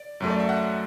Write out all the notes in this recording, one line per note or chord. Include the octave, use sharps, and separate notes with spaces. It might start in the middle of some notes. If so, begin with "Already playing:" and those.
Already playing: D5
F#2 F#3 A3
D5
E5
F#5